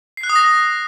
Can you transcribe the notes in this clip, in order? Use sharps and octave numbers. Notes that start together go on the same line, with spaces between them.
C7
F#6
D#6
A#6
D#6